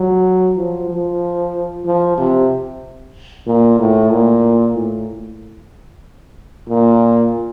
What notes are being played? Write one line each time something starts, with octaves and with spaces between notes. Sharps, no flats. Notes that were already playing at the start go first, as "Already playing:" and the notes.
Already playing: F#3
F3
F3
F3
C3
A#2
A2
A#2
A2
A#2